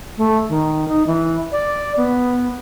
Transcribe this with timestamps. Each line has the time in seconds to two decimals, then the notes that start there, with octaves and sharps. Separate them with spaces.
0.17 A3
0.49 D#3
0.88 D#4
1.07 E3
1.52 D5
1.97 B3